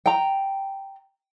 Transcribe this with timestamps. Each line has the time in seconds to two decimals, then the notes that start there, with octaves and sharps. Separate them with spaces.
0.06 G5 A#5